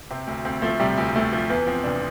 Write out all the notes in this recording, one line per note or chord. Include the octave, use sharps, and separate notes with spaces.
C3 C4
D2
D2 C4
F3 A3
C3 G3
D2
D2 A3
F3
E2 B3
F3 C4
F1 D4